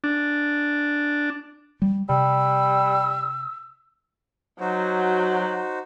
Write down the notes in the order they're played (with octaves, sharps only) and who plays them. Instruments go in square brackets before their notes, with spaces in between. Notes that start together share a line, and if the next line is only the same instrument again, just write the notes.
[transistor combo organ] D4
[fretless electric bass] G3
[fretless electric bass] C3 [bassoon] G3 [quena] E6
[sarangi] F#3 [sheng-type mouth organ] D#4 F#4 C5